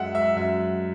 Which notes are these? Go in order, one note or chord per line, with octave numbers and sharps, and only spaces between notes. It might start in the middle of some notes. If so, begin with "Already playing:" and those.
Already playing: F#2 G#3 E5 F#5
E5
F#2 E5